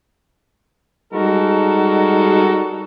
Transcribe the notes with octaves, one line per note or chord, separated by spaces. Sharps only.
G3 G#3 D#4 F#4 A4 A#4